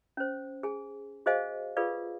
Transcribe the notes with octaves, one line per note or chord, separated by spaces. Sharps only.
C#4 C5
G#4 G#5
F#4 G#4 C5 D#5 F5 G#5
F4 G#4 A4 B4 D5 F5